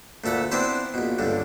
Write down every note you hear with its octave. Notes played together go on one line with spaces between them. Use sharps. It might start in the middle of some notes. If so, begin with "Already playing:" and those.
D2 A#2 A4 E5 F#5
B3 C4 D4 E4 B4 C5
A#1 B2
C#2 G2 D3